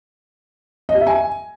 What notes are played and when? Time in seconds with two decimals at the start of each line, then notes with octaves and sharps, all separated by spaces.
0.89 D#5
0.95 G4
1.01 E5
1.07 G#5